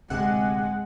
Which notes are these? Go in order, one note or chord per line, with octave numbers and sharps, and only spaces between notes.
D1 D2 C3 G#3 F#5